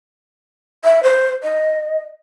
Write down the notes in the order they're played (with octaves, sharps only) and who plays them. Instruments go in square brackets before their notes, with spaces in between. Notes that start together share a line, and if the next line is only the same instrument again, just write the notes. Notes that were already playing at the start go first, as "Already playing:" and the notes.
[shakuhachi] E5
C5
D#5